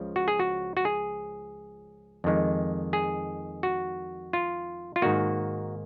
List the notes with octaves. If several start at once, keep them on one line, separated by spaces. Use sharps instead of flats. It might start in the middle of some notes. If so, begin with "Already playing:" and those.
Already playing: C#2 C#3 F3
F#4
G#4
F#4
F#4
G#4
F2 D#3 G#3
G#4
F#4
F4
F4
G#2 D#3 A#3 F#4